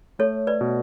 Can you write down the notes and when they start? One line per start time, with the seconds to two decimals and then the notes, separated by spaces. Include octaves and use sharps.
0.19 A3 A4 C#5
0.47 B4 D5
0.61 B2